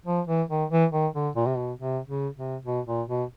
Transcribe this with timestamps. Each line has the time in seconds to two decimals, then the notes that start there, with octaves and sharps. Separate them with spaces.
0.06 F3
0.27 E3
0.49 D#3
0.70 E3
0.92 D#3
1.14 D3
1.36 A#2
1.47 C3
1.57 B2
1.79 C3
2.08 C#3
2.36 C3
2.65 B2
2.87 A#2
3.08 B2